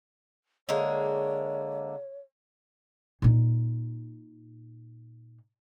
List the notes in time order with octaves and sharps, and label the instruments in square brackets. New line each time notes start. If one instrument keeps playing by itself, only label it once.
[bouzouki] D3 G#3 A#3 [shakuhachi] C#5
[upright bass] A#2 D#4